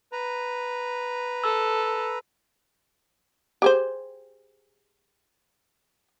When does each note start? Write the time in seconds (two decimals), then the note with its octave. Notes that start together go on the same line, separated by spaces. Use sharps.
0.12 B4 A#5
1.44 A4 E6
3.62 G4 G#4 C5